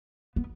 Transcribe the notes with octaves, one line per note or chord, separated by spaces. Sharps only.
B3